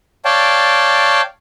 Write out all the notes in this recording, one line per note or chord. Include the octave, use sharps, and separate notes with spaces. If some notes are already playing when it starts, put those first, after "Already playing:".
C#5 D5 F5 G5 A5